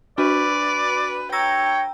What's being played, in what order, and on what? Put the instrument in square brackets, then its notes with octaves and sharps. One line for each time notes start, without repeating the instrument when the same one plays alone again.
[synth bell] D4 F#4 [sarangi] B4 [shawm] D5
[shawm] C#5 [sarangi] G5 [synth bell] A#5 E6 A#6